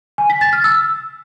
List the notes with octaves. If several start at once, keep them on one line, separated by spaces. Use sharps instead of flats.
G#5
B6
A6
F6
E6